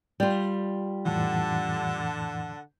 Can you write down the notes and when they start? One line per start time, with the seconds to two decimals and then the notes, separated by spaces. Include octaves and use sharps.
0.20 G3 F4
1.06 F2 A2 D3 E3 F#5 A5